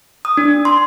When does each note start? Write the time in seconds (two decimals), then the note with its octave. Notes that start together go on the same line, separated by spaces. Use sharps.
0.25 D#6
0.37 D4
0.65 C6